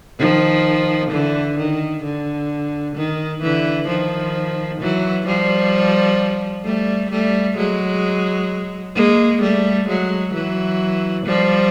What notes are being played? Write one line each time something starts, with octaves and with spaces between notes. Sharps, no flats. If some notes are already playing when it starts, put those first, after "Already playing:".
D#3 F3
D3 E3
D#3
D3
D#3
D3 E3
D#3 F3
E3 F#3
F3 G3
G3 A3
G3 A3
F#3 G#3
G#3 A#3
G3 A3
F#3 G#3
E3 F#3
F3 G3